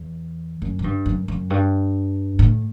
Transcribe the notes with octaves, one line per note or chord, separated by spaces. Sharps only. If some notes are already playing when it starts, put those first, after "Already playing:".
Already playing: E2
F#2
A2
G2
F#2
F#2
G2
A2